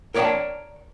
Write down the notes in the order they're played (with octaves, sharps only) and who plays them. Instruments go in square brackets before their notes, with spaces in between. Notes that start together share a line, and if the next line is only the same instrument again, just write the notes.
[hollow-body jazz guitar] A#4 C#5 D5 E5 G5 A5